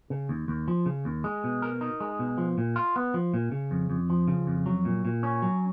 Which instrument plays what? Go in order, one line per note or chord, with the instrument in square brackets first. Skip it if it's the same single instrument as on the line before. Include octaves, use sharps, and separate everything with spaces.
[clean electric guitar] C#3
D#2
D#2
F3
C#3
D#2
G#3
B2
A#4
D#4
G#3
B2
F3
A#2
F4
B3
F3
A#2
C#3
F2
F2
F3
C#3
F2
F#3
A#2
A#2
C#4
F#3